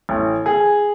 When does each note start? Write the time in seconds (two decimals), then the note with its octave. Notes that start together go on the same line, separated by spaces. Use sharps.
0.09 A1
0.46 G#4